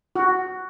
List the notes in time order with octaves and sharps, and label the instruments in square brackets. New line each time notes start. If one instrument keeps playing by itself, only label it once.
[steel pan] F#4